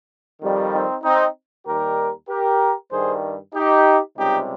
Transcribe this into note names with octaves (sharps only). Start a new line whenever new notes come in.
F2 D#3 G3
C4 D#4
C4 D#4
D#2 D#3 G3 G4 A#4
G4 A#4
G2 D#3 G3 G#4 C5
D#4 G4
C#2 C3 G3 D#4 G4